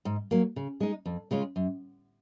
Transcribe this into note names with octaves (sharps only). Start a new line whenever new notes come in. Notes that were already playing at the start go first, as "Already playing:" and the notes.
G#2
F#3 A#3
C#3
G#3 D#4
F2
C#3 G#3 C#4 F4
F#2